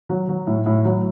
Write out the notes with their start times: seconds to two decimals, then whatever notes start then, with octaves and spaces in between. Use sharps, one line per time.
0.09 F#3
0.29 F#3
0.47 A2
0.66 A2
0.85 F#3